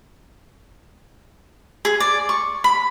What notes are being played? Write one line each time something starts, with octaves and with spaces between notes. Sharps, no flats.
G#4
D5
C#6
B5